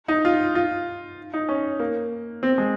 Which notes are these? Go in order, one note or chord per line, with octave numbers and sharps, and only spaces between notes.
D#4
F4
F4
D#4
C#4
A#3
C4
G#3